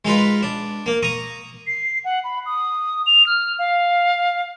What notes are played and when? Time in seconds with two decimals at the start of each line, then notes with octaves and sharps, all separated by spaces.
0.05 G#3 D#4 F4 B4
0.43 D4
0.86 A#3
1.03 A#5 C#6 D#6
1.67 C7
2.04 F#5
2.24 B5
2.46 D#6
3.06 F7
3.26 F6
3.59 F5